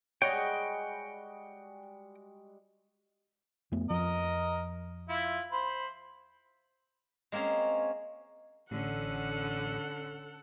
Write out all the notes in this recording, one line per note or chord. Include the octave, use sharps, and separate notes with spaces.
G3 G#3 F#4 C#5 D#5 F#5 G5
F2 A3 B3
F2 F3 A#4 D#5
E4 F4
C5 B5
G#3 A#3 C4 C#4 G#4
A1 D3 C#4 A4 F#5